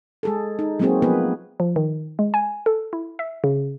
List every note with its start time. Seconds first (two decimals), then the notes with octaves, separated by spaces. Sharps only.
0.23 G#3 G#4 A4
0.59 D#4
0.79 F#3 G#3 A#3 C4 F#4 G#4
1.02 F3 A#3 B3 G#4 B4
1.60 F3
1.76 D#3
2.19 G#3
2.34 G#5
2.66 A4
2.93 E4
3.19 E5
3.44 C#3